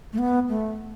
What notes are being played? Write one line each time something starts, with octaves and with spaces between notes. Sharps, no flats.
A3
B3
A3